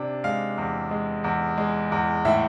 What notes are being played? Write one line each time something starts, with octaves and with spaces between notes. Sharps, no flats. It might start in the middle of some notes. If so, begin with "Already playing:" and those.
Already playing: C3 D4
G#3 F5
E2
G#3
E2
G#3
E2
A2 E5